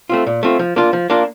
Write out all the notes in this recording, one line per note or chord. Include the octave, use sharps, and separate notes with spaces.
A3 C4 F4
A#2
A3 C4 F4
F3
A#3 D4 F4
F3
A#3 D4 F4